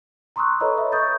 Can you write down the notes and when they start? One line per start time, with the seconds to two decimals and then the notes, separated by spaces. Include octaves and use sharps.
0.36 A#5 C6 C#6 D#6 E6 F#6
0.60 A4 B4 C#5 D#5 A#5 B5
0.78 E5
0.92 C#6 D#6 G6 A6